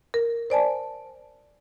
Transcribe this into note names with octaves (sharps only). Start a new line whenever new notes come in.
A#4
C5 D5 G#5 A5